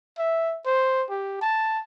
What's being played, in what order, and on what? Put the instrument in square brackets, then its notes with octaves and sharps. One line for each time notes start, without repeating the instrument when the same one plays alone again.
[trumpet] E5
C5
G4
A5